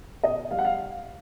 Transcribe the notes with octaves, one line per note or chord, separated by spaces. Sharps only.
B2 D#5
G3 F5
F#5
F5